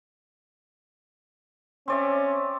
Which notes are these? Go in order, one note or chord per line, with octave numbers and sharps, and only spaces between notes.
C4 C#4 D5 E5